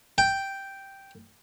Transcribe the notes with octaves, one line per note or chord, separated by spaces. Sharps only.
G5